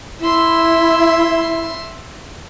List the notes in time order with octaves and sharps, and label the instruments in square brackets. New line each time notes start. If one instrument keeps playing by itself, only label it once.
[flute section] E4 [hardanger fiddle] E5 C6